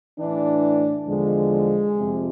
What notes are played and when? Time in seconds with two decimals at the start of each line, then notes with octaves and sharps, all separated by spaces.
0.19 A2 E3 D4
1.08 E2 D3 F3 G#3
1.97 F2 C3 F3